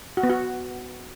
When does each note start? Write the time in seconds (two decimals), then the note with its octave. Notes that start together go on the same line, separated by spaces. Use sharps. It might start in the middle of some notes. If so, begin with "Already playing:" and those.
0.17 F#4
0.23 B3
0.30 F#4